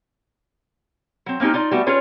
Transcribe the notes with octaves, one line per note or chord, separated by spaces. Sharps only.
F#3 C4
A#3 C4 C#4 D#4 G4
D#4 F4 D5
G3 A3 B3 F#4
C#4 F4 G#4 B4 C#5